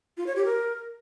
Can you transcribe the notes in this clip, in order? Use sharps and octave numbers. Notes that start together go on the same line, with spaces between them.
F4
C#5
G4
A#4